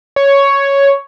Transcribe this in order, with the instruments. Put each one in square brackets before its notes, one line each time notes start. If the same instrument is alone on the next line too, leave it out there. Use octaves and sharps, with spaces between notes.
[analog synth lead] C#5